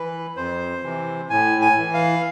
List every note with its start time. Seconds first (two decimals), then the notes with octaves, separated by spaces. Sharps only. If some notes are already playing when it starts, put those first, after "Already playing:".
Already playing: E3 B4
0.36 F2 C5
0.84 C3 E3
1.30 A2 G#5
1.62 G#5
1.77 E3
1.94 F5